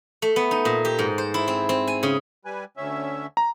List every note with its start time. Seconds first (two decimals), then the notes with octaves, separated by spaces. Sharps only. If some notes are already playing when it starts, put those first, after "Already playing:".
0.22 A3
0.36 B3
0.51 D#4
0.65 A#2
0.85 G4
0.99 G#2
1.18 C5
1.34 E4
1.48 C4
1.69 C4
1.87 G#5
2.03 C#3
2.45 G3 B4 G#5
2.77 D2 C#4 E5
3.37 A#5